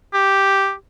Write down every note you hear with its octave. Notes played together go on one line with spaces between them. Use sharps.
G4